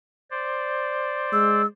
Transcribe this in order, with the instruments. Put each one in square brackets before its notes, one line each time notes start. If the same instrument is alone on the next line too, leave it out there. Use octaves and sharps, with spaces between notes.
[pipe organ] C5 D5
[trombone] G#3 [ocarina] E6